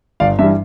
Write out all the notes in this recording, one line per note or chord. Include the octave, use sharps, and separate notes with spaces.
G1 D5 F5
G2 E3 G3 E5